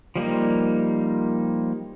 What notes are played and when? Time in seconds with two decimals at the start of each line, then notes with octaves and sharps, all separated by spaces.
0.16 F3 G3 A#3 D#4